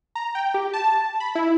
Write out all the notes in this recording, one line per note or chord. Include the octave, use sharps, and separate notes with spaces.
A#5
G5
G4
A5
B5
E4